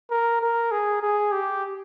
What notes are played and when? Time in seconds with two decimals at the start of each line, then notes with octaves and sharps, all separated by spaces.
0.10 A#4
0.41 A#4
0.71 G#4
1.02 G#4
1.32 G4